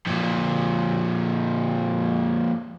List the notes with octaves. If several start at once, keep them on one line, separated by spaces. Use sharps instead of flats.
F2 A#2